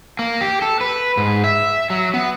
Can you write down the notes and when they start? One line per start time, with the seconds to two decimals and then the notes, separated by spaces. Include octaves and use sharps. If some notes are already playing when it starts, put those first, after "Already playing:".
0.19 A#3
0.41 G4
0.62 A4
0.81 B4
1.17 G#2
1.44 E5
1.90 F#3
2.14 B3